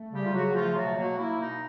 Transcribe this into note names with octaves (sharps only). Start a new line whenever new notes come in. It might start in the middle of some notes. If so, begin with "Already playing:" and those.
Already playing: A3
C#3 G3 G4
F4
C#3 F#3 F#4
F3 A3 F4
B2 F#3 F#4
F#3 A#3 F#4
A#3 E4
B2 D#4